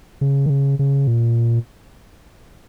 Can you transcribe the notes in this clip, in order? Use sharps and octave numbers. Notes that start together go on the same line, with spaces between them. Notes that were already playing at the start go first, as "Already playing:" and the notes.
C#3
D#3
C#3
C#3
A#2